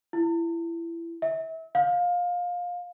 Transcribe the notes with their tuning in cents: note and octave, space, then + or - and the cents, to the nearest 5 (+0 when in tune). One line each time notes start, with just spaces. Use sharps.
E4 +25
E5 -35
F5 +20